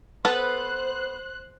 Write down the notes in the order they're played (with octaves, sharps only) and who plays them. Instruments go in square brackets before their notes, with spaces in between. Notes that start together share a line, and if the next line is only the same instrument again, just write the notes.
[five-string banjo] B3 A4 B4 [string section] C5 F#6